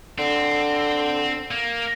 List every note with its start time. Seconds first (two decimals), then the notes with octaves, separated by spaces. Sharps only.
0.18 D3 C4
1.51 A#3